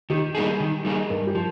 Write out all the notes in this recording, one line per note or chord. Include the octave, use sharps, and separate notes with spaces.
D#3 G4
G3 A#3 D#4 G#4
D#3
G3 A#3 D#4 G#4
G2 A#4
G4
F3